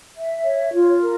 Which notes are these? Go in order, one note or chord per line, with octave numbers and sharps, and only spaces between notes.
E5
C#5
F4
A#4